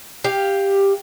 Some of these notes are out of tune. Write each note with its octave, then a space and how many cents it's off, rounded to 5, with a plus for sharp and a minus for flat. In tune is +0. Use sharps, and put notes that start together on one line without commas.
G4 +10 F5 +0